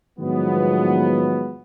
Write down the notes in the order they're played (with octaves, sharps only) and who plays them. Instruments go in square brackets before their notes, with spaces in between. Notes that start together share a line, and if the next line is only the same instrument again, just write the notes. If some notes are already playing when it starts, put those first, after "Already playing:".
[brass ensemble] A2 D#3 F3 F#3 G#3 B3